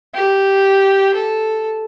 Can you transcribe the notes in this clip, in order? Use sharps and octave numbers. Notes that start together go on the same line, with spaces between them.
G4
A4